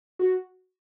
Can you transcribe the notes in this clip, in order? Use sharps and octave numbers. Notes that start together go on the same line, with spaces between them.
F#4